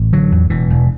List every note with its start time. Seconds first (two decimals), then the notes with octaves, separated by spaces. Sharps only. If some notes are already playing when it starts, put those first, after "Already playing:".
Already playing: A1
0.13 D3 F#3
0.32 E2
0.50 E1 E3
0.70 E1